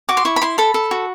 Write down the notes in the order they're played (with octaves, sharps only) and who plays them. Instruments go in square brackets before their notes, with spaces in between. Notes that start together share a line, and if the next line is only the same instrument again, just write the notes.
[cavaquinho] F#4 D6
C6
E4 C#6
B5
E4 C6
A4 B5
A4
F#4